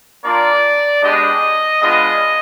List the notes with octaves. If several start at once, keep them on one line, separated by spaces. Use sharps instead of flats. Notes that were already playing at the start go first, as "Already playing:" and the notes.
A#3 D4 F4 D5
G#3 B3 D4 G4 D#5
G#3 B3 D4 F4 D#5